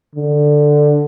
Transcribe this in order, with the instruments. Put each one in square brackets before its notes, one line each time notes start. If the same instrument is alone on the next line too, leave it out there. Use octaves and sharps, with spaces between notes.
[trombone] D3